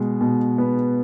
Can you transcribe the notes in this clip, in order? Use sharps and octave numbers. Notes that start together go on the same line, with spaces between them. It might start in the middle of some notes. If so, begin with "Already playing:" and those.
Already playing: B2 G#3
B2
B3